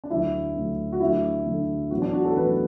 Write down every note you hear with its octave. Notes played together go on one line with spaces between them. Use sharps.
D4
D2 D3 F#3 A3 E4
D2 D3 F#3 A3
F#4
D2 D3 F#3 A3 E4
D2 D3 F#3 A3
A1 A2 F#3 B3 F#4
D4
F#4
A4
A1 A2 F#3 B3 B4